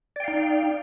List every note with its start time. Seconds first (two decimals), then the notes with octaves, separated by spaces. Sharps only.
0.16 D5
0.20 G5
0.24 F5
0.28 D#4